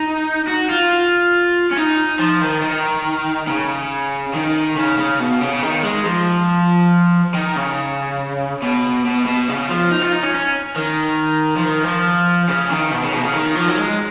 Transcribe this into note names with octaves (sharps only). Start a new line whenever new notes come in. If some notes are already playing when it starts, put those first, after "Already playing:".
Already playing: D#4
F#4
F4
C#4
D#4
F3
D#3
D#3
C#3
D#3
C#3
C#3
B2
C#3
D#3
G#3
F3
D#3
C#3
B2
B2
B2
C#3
F3
D#4
F4
D#4
C#4
C#4
D#3
F3
D#3
F3
C#3
D#3
B2
C#3
B2
C#3
D#3
F3
F#3
G#3